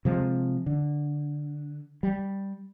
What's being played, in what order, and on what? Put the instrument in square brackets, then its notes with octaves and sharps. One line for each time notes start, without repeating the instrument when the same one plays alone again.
[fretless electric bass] C3 F3 G#3
D3
G3